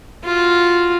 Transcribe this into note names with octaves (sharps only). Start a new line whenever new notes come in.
F4 F#4